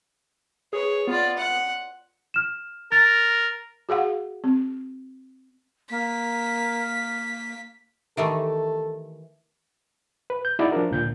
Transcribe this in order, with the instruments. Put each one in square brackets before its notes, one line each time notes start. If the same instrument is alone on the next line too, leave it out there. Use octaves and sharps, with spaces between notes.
[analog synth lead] G#4 [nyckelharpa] B4 C#5
[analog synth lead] B3 [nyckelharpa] F4 D5
[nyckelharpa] F#5
[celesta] F6 E7
[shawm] A#4 [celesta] A6
[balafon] F#4 G#4 F5 F#5
C4
[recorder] A#3 [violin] B6
[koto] D#3 E3 A3 [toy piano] G4 E5 [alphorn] A4
[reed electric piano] B4
G6
D#4 E4 F#4 G#4 D5
F3 D4 A#4
C#2 A#2 D3 G6